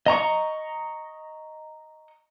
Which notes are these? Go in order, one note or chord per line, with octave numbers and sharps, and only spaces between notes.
D#5 A#5 C#6